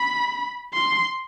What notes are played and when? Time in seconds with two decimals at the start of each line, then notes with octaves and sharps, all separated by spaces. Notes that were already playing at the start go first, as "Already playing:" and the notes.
Already playing: B5
0.74 C6